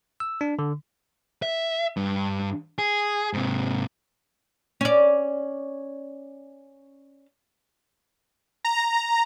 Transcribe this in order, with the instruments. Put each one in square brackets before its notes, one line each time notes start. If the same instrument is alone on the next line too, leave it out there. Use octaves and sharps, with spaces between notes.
[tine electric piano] E6
D4
D3
[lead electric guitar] E5
G2
G#4
G#2 C3
[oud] C#4 D5
[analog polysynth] A#5